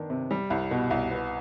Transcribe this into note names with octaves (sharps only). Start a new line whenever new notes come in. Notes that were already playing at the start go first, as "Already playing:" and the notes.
Already playing: D#3 B3 D4
C3
G3
C2
B2
C2
B3